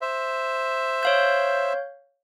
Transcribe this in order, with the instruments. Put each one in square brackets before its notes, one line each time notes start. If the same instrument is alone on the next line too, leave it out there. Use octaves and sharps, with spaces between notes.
[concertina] C5 E5
[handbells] C#5 F5 G6